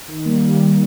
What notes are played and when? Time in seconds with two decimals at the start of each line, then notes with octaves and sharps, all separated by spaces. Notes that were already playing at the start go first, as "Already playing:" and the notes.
0.08 D#3
0.26 G3 A#3